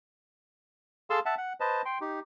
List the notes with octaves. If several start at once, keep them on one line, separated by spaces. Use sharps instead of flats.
G#4 A4 F5 A5 C6 E6
E5 F#5 A5
F#5
B4 C5 D#5 A5
G5 C6
D#4 G4